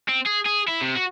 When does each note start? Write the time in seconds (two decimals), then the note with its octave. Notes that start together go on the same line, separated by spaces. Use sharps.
0.09 C4
0.26 G#4
0.45 G#4
0.68 E4
0.81 C3
0.96 F#4